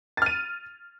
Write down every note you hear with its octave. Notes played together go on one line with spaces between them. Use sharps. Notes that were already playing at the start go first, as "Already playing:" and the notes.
F6 A6 D#7